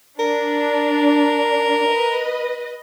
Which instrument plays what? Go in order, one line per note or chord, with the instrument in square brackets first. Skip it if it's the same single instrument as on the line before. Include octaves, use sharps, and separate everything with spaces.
[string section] D4 [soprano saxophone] A#4
[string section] B4 D#5